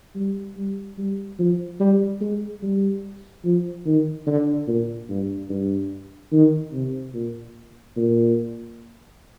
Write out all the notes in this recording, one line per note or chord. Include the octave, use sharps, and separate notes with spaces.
G3
G3
G3
F3
G3
G#3
G3
F3
D#3
D3
A#2
G2
G2
D#3
C3
A#2
A#2